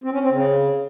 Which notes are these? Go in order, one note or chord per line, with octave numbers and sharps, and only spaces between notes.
C4
C#4
C4
C#3